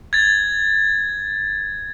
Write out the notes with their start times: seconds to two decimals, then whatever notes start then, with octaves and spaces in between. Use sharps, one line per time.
0.13 G#6 A6